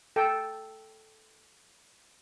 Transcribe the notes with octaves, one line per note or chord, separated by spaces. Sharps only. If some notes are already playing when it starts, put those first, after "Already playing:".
A4 G5